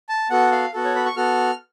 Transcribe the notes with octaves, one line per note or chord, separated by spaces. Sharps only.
A5
B3 F#4 A4 F#5
F5
B3 F#4 A4
C#5
B5
C#6
B3 F#4 A4 F6